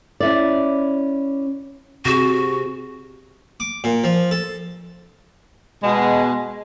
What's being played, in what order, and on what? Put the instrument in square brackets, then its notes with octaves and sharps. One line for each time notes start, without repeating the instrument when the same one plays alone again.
[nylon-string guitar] C#4 E4 D5
[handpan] C3 G#4 [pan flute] F#4
[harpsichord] D6
A#2
F3
A4
[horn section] B2 G#3